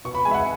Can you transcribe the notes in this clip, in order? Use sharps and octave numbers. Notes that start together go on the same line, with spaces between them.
B2 C#6
B5
G#3 G#5
E5
F#5